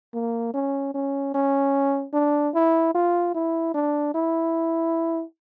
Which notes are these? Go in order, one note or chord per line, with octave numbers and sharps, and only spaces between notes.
A#3
C#4
C#4
C#4
D4
E4
F4
E4
D4
E4